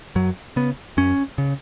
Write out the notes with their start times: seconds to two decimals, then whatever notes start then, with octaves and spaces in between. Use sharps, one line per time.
0.15 F#2 F#3
0.56 C#3 B3
0.97 F#2 C#4
1.38 C#3